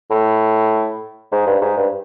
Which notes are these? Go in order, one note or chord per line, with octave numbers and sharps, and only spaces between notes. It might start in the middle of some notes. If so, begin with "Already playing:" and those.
A2
G#2
G2
G#2
G2